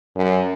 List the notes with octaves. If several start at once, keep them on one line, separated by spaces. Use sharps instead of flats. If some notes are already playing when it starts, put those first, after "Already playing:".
F#2